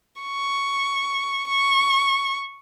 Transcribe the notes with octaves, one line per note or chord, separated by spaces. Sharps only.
C#6
C#6